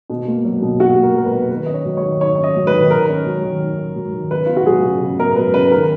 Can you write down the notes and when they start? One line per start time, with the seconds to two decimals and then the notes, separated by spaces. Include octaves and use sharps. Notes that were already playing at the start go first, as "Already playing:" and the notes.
0.10 B2
0.27 A#3
0.45 F#3
0.62 B2
0.80 B2 F#4
0.98 A#3
1.03 A#4
1.16 F#3 A#4
1.26 B4
1.33 B2
1.51 D#3 B4
1.66 C#4 D#5
1.74 C#5
1.85 F#3
1.97 C#5
2.03 D#3
2.20 D#3 C#5
2.38 C#4
2.44 D#5
2.56 F#3
2.67 B4
2.74 D#3
2.91 D#3 A#4
3.09 C#4
3.26 F#3
3.44 D#3
3.61 D#3
3.78 C#4
3.96 F#3
4.13 D#3
4.31 C#3 B4
4.46 B3 F4
4.57 F#4
4.66 F#3 G#4
4.84 C#3
5.01 C#3
5.19 B3 A#4
5.36 F#3 B4
5.54 C#3 B4
5.72 D#3 A#4